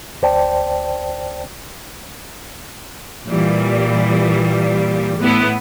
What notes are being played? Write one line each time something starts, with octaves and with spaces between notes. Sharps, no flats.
D2 C5 D5 G5 A5
A#2 E3 G3
A2 B3 E4